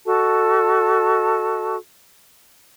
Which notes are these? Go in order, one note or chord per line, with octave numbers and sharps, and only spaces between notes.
F#4 A4 D#5 A5